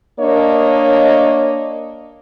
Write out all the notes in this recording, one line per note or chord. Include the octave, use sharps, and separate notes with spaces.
A#3 D4 A#4 C#5 D#5